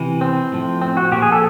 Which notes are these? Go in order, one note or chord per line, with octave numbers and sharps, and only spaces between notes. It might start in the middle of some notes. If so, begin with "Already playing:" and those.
Already playing: C3 E3
C4
A2 F3
C4
F#4
A#2 F3 G4
G#4
A4